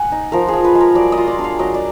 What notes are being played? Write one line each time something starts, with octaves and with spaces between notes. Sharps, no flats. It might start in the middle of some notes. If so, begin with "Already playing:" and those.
Already playing: F#5 G#5
D#4
F3 A#4
G#4
F3
B4
G#3
A#4
F#3 D5
D#5
F4
D5
D4
F5
F#3 D#5
D5